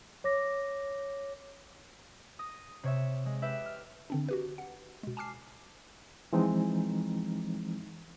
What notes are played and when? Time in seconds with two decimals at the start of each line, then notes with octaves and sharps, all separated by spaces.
0.24 C#5 D6 A#6
2.39 D#6 A#6
2.83 C3 C#5 E5
3.26 G#3
3.42 G4 A4 B4 E5
3.65 F6
4.10 D3 C4 D4
4.29 F#4 G4 B4
4.58 F#5
5.03 B2 G#3
5.17 G#5 A5 D6 F6 C7
6.33 E3 F3 G#3 C4 D#4